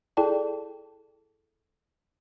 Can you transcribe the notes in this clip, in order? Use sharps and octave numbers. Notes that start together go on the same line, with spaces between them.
E4 G#4 A4 D5 G5 A5